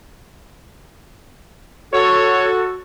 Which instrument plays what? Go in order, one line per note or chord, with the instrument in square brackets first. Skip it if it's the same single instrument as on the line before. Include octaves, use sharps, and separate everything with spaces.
[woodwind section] F#4 A4 [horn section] C#5